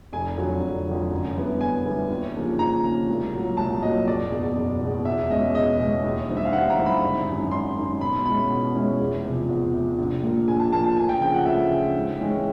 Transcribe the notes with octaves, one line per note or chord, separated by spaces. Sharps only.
F1 G#5
F2 D3 F#3
F1
F2 D3 F#3
F#2
D3 G3 B3 E4
F#2 G#5
D3 G3 B3 E4
D#2
C#3 F3 A#3 D4
D#2 A#5
C#3 F3 A#3 D4
C2
A#2 F#3 A#3
C2 A5
A#2 F#3 A#3 D#5
F#1 D5
E2 B2
F#1
E2 B2
E2 E5
B2 G#3 C#4 D#5
E2 D#5
B2 G#3 C#4
D#2
D3 G3 C4 E4
E5
F5
D#2 F#5
A#5
D3 G3 C4 E4
B5
G#1
F#2 D#3
G#1 C6
F#2 D#3
B2 B5
G#3 C#4 E4 B5
B2
G#3 C#4 E4
E2
C3 F3
E2
C3 F3
A#1
A#2 F3 A#3
A#1 G#5
A5
A#2 F3 A#3 A5
A5
D2 G#5
G5
C#3 F3 G5
F#5
D2 E5
C#3 F3
G#2
E3 G#3 C#4